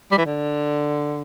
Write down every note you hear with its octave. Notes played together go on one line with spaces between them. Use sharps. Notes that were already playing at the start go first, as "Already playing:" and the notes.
G3
E3
D3